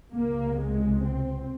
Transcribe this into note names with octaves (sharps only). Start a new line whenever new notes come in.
C#2 C3 A#3
G#3
C4